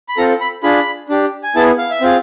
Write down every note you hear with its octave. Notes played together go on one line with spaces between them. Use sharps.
B5
C4 F4 A4 A#5
B5
D4 F4 G#4 B5
D4 G4
G#5
B3 E4 G#4 A5
F5
E5
C4 F4 G#4 F5